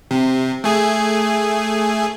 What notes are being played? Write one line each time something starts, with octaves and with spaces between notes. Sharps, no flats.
C3
A3 G#4